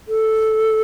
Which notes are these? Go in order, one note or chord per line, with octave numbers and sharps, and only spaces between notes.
A4